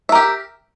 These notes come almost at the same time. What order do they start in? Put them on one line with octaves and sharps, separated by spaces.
E5 A#4 G4